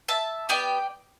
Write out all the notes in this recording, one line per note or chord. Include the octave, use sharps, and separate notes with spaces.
E5 A5
B3 G4 D5 G5